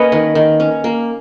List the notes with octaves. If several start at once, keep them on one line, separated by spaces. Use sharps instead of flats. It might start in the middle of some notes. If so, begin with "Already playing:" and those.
Already playing: A#3 C#4 B4 C#5 D#5
D#3
D#3
C#4
A#3